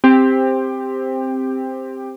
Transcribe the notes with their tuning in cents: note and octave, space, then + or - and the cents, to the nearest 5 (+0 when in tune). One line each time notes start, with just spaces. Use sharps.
C4 +0 G4 +15